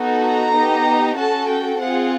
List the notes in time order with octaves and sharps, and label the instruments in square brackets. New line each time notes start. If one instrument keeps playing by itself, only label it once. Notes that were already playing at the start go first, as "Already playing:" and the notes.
Already playing: [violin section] B3 D#4 F#4 A4
A#5
B3 D#4 G4
C#4 F#4 A4 A5
G5
C4 F4 G#4 F#5